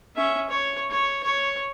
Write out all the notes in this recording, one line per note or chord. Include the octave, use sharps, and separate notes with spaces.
C#4 E5
C#5
C#5
C#5